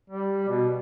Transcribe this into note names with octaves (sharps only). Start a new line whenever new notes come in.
G3
B2